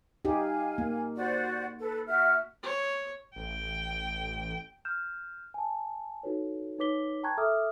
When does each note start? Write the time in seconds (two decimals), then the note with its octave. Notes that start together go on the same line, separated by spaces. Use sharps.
0.25 D#4 G4 F5 G#5
0.78 A#3
1.15 F#4 C5 D5
1.79 A4 B4
2.07 F#4 E5 F6
2.63 C#5
3.36 A1 G5
4.85 F6 G6 E7
5.54 G#5 A5
6.23 D#4 E4 F#4 A4 B4 C#5
6.79 D#4 B4 C#5 D6 B6 G7
7.23 G5 A5 A#5 C#6 F#6 G#6
7.38 A4 E5 D6 D#6 F6